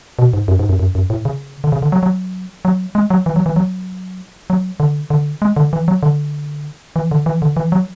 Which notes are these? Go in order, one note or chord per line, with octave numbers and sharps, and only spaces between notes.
B2
G#2
F#2
G#2
F#2
F#2
F#2
A2
C#3
D3
C#3
D3
F#3
F#3
F#3
G#3
F#3
E3
F#3
E3
F#3
F#3
D3
D3
G#3
D3
E3
F#3
D3
E3
D3
E3
D3
E3
F#3